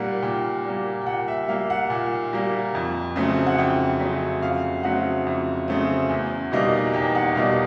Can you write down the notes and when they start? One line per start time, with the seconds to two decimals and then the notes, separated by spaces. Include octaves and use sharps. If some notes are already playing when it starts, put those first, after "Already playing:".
Already playing: A#2 G3 A#3 F#5
0.22 A#2 G5
0.64 G3 A#3
1.01 G5
1.06 A#2 F#5
1.28 E5
1.48 G3 A#3 F5
1.70 F#5
1.90 A#2
2.33 G3 A#3
2.75 F2
3.16 C#3 F#3 A3 C4
3.46 F#5
3.58 F2 G5
4.00 C#3 F#3 A3 C4
4.42 F2 F5
4.83 C#3 F#3 A3 C4 F#5
5.27 F2
5.68 C#3 F#3 A3 C4
6.09 E2
6.52 B2 G3 A#3 D#4
6.93 E2 G5
7.15 F#5
7.35 B2 G3 A#3 D#4 F5